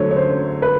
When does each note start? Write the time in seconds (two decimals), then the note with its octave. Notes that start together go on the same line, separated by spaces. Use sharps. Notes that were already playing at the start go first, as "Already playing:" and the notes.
Already playing: D3 F#3 A3 C5 C#5
0.11 C#5
0.16 C5
0.62 B4